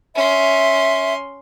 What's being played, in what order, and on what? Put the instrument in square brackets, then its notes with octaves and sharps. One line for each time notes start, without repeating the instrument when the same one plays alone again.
[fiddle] C#4 C6 [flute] E5